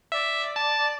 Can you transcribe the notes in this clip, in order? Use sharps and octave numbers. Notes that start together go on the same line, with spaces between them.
D5 E5
A5